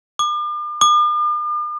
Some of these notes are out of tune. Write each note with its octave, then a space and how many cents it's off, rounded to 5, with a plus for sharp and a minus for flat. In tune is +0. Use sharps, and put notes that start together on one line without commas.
D6 +40
D6 +45